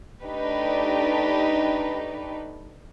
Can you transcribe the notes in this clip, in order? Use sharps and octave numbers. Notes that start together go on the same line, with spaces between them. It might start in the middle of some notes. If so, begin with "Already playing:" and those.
A3 D4 D#4 G4 B4